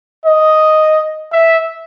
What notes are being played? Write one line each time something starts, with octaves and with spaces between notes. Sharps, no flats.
D#5
E5